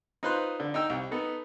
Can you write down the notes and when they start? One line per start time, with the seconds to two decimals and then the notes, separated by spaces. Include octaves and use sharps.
0.23 D#4 F4 B4 C5 C6 F#6
0.60 D3
0.74 D#4 D#5 G5 E6
0.90 C2
1.11 B3 D#4 A4 B4